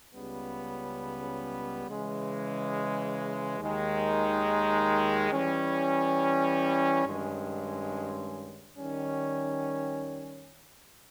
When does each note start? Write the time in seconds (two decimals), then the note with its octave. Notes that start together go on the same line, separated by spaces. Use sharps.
0.15 C#2 C#3 G3 B3
1.88 C#3 E3 G#3
3.60 D#2 D#3 G#3 D#4
5.31 E3 G3 C#4
7.04 G2 D#3 G#3 C#4
8.76 D#3 G3 C#4